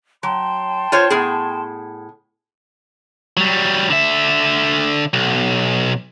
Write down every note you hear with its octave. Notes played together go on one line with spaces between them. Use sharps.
F#3 G5 A5 C6
F4 C5 C#5
A2 B3 G#4
F#3 G3
D3 E5
B1